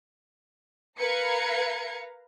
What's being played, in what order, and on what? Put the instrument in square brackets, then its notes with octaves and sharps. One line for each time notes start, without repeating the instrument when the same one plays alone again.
[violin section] A#4 B4 F5 A#5 G#6 C#7